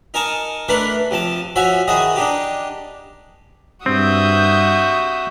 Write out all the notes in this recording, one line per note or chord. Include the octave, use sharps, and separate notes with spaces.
D#4 A#4 G#5 A5 C#6
E3 A3 D4 A#4 B4
C3 F3 A5
F3 F#4 C#5 E5 G#5
D#3 E3 F#4 G#4 D#5
D4 D#4 G4
G2 C4 F#4 E5 D#6 G6